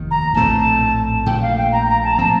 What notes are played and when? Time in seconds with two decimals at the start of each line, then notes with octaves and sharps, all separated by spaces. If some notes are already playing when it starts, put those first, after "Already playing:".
Already playing: F1 D#2 D#3
0.10 A#5
0.34 A#1 A2 A3 C4 A5
1.26 A#1 A#2 A3 G5
1.42 F5
1.57 G5
1.72 A#5
1.88 A#5
2.04 A5
2.12 A#5
2.18 A2 F3 C4 A5